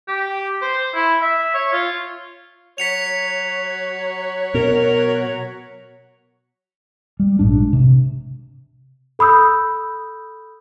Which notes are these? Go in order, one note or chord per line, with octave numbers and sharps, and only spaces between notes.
G4
C5
E4
E5
C#5
F4
F#3 F#4 C#5 B6 C#7 F7
B2 A#4
G3
A#1 G#2 D4
C3
A4 B5 D#6 E6 G6